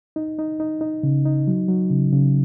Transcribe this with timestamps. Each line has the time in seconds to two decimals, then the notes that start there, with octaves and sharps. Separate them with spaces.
0.16 D#4
0.38 D#4
0.60 D#4
0.81 D#4
1.03 C#3
1.25 D#4
1.47 F#3
1.68 F#3
1.90 C#3
2.13 C#3